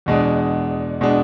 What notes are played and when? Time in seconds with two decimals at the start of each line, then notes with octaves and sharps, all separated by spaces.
0.06 E2 B2 G#3 D4
1.01 B2 G#3 D4